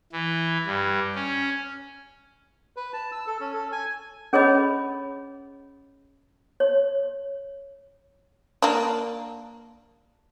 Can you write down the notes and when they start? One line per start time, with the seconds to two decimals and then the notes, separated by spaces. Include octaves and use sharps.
0.12 E3
0.66 G2
1.15 C#4
2.76 B4
2.93 A5
3.12 E6
3.27 A4
3.40 C#4
3.53 A4
3.72 G#5
4.33 C#4 G#4 C#5 D#5 B5
6.60 C#5
8.62 A#3 D4